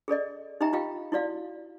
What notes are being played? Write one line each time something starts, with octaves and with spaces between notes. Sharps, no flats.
G#4 A4 D5 D#5
D#4 G4 D#5 E5 G5 A#5
F4 G4 D#5 F5 G5
E4 F#4 D5 F5